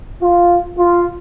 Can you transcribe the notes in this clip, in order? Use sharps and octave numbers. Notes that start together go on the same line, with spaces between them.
F4
F4